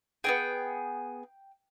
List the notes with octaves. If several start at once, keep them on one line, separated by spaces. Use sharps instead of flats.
B3 D#4 G#4 G5